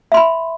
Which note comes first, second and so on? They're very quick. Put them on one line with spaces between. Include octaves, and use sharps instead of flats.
E5 C6 B5